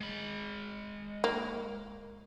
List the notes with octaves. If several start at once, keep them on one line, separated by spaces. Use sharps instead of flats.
G#3 B5
A#3